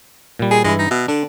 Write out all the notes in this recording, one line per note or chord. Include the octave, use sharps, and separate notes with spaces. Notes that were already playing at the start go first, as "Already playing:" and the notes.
A#2 G3
G#4
G2 E3 G#3 E4
D#4
B2 E5
D3 D4